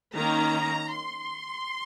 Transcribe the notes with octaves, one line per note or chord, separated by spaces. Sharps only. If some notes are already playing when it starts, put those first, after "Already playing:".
D#3 A#3 C#4 A#5
C6